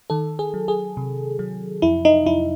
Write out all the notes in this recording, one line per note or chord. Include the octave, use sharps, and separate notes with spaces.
D#3 A4
G#4
F#3
G#4
C3
F#3
F2 E4
D#4
F2 E4